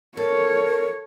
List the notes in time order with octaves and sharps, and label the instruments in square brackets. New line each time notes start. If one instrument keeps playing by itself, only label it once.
[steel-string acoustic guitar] A4 [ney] A#4 [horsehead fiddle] C#5